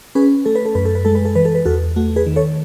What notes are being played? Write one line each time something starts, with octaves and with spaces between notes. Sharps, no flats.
C#4 G#4 B4
A3 A4
B4
A4
F#2 B4
A4
B4
G#3 A4
B4
A4
E3 B4
A4
B4
E2 F#4 A4
A3 F#4
G#4 B4
D#3
A4 C#5